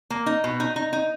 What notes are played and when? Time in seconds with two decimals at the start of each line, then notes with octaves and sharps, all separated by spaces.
0.10 A#3
0.26 D#4
0.44 B2
0.60 D#4
0.76 D#4
0.93 D#4